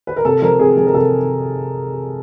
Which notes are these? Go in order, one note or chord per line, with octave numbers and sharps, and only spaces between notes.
B4
A#4
C3 A4
F3 A#4
C3 G#4
F3 G#4
A#4
C3 A4